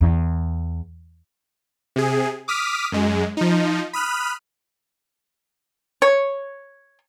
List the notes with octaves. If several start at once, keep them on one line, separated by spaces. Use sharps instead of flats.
E2
C3 G#4
D6 D#6 F6 B6
F#2 G#3
F3 D#4
B5 D#6 F6 F#6
C#5